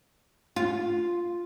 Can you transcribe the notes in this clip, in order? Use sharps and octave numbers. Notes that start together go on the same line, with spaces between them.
F4